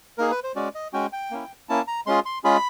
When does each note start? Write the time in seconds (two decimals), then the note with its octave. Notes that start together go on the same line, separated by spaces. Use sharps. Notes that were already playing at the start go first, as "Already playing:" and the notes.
0.18 A#3 D#4 G#4 A#4
0.31 B4
0.44 C5
0.56 G#3 C#4 F#4 D5
0.75 D#5
0.93 G#3 C#4 F#4 G5
1.13 G5
1.31 A#3 C#4 E4
1.69 A#3 C#4 E4 A5
1.87 A#5
2.07 G#3 C#4 F4 G#4 C6
2.25 C6
2.44 G#3 C#4 F4 G#4 B5